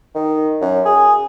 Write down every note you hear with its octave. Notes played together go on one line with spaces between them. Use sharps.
D#3
F#2
G#4